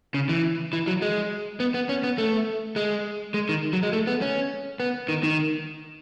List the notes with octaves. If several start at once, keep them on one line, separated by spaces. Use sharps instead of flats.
C#3
E3
E3
F#3
G#3
B3
B3
C#4
B3
A3
G#3
G#3
D#3
F#3
G#3
A3
B3
C#4
B3
D#3
D#3